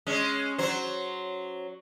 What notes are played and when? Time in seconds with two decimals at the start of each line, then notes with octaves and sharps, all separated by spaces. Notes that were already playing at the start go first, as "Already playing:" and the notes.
0.07 G#3 C#4
0.58 F#3 C5